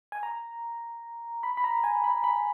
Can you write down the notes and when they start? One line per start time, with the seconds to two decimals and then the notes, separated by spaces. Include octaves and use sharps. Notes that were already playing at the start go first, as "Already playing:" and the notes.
0.12 G#5
0.23 A#5
1.43 B5
1.57 B5
1.64 A#5
1.84 G#5
2.04 B5
2.24 B5